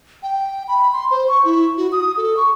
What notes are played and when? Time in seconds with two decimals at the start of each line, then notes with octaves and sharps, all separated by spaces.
0.23 G5
0.68 B5
0.93 C6
1.11 C5
1.28 C#6
1.45 E4
1.77 F#4
1.92 D#6
2.17 A4
2.37 C#6